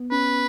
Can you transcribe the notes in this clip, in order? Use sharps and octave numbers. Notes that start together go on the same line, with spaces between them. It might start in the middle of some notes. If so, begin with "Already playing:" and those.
Already playing: B3
C#4 B4